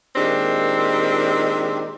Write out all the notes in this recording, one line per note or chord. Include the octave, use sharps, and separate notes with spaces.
A#2 D#3 G#3 C4 D4 G4